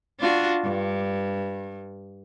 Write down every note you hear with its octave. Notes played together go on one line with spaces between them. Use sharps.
D4 F4 F#4
G2